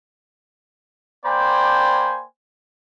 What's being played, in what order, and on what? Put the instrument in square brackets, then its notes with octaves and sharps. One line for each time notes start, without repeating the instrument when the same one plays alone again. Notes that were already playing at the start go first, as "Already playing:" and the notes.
[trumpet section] A#3 C5 D5 G5 G#5 B5